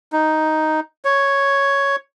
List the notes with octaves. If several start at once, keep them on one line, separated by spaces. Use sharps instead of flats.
D#4
C#5